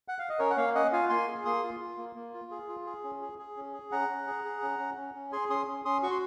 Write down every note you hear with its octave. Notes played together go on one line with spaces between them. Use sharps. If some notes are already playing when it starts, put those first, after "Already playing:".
F#5
F5
D#5
C#4 A#4 C#5
F#5
A#3 C#5 F5
C#4 D#5 F#5
F4 F5 G#5
A#3 G#5 C6
G#4
A#3 C6 D#6
F4
F4
A#3
A#3
F4
G#4
F4
G#4
C#4
G#4
G#4
C#4
G#4
C#4 F#5 A#5
C#4
G#4
G#4
C#4
C#4
C#4
C#4
G#4 G#5 C6
C#4 C6 D#6
C#4
C#4 C6 D#6
F#4 C#6
C6